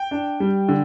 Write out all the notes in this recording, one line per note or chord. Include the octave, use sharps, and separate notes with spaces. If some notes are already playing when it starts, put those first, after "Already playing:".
Already playing: G5
D4
G3
D3